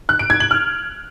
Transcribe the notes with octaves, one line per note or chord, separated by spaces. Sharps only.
F#6
D7
G#6
F#7
F6